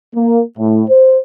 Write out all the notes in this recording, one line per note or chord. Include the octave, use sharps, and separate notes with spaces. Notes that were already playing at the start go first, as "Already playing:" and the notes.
A#3
A2
C5